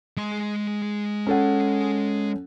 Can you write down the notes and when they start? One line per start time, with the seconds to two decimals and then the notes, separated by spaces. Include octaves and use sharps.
0.17 G#3 C6
1.27 C#4 A4 F#5